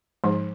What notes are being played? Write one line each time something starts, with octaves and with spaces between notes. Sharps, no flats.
G#2 F3